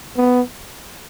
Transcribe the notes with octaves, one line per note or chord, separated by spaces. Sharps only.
B3